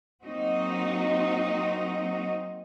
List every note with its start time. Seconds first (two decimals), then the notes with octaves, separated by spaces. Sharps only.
0.24 F#3 A#3 C4 D#4 F#4 D#5